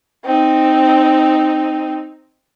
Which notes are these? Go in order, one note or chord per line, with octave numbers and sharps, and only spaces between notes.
C4 D#4